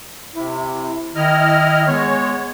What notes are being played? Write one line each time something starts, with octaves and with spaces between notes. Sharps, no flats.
C3 E4
D#3 E4 D#5 F6
G#3 B3 C#5